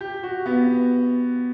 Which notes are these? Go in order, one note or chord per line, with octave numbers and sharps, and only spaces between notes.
G4
F#4
B3